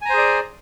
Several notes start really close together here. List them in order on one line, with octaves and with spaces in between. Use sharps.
G#5 A#5 C5 G#4 D5